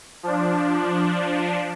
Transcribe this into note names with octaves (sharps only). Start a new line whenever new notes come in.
F3 D4